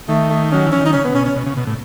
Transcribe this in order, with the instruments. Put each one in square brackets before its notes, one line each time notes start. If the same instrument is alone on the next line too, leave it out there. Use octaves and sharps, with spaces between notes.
[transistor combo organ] D#3 [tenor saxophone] A3
[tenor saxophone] A3
[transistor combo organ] F#3 [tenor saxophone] C#4
[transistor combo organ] E3
[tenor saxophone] C#4
[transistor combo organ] D#3
[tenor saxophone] D#4
[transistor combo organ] C#3 [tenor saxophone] C#4
[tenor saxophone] B3
[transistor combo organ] B2 [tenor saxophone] C#4
[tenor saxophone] C#4
[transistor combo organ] B2
C#3
B2
A2